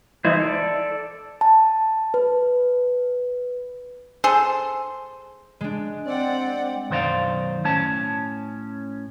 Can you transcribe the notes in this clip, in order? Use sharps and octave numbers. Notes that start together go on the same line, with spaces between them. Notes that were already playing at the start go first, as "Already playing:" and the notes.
E3 D#4 E4 C5
A4 D5
A5
B4
G#4 A4 C5
G#3 D4
C4 D5 F#5 G5
B1 F#2 D#3 C5 D5 F5
A2 C#4 A5